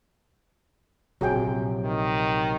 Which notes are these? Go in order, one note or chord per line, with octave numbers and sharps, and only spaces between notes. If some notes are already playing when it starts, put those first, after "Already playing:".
A#1 C3 F#3 F#4 G#4 G5
D#3